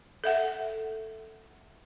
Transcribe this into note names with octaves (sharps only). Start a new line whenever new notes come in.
A4 E5 F#5